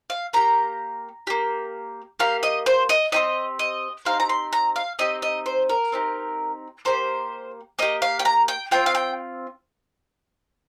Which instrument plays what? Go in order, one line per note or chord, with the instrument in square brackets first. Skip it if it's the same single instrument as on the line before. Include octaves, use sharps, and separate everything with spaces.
[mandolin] F5
A#3 G4 A#5
A#3 G4
A#3 G4 F5
D#5
C5
D#5
C4 D#4 G4 D#5
D#5
C4 D#4 G4 F5
A#5
C6
A#5
F5
C4 D#4 G4 D#5
D#5
C5
A#4
C4 D#4 G4
A#3 G4 C5
A#3 G4 D#5
F5
G5
A#5
G5
C4 F4 G5
F5
G5